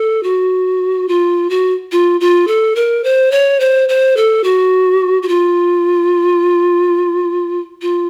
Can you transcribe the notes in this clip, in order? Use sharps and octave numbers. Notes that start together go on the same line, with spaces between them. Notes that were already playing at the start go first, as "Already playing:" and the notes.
Already playing: A4
F#4
F4
F#4
F4
F4
A4
A#4
C5
C#5
C5
C5
A4
F#4
F#4
F4
F4